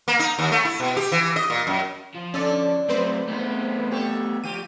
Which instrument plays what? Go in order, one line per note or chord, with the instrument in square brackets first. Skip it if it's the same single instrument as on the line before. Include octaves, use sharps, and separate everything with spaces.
[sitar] A#3
D#4
D#2
A3
E4
B2
G4
E3
D#5
A#2
F#2
[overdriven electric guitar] F3
[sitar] D3 D4 [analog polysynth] C#4 A4 D5
[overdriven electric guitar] F#3 A3 [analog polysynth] C4 B4 C5
[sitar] E2 D#4 [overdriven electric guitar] A3 B3
[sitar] G4 A4 C#5
[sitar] F3 F4 G4 [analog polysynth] D#7